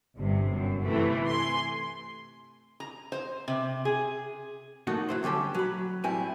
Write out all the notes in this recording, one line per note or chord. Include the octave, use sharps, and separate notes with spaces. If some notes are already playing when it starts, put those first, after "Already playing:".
G1 G2 C3
F#2
C3 E3 A3
G#5 C6
A#5
C5
C3
G#4
F#3 A3 A#3 D#4 F#4
F#3 E4 C5
D3 G3 C#4 G4 A4
F#3 B5
A2 G3 C4 E4 G#5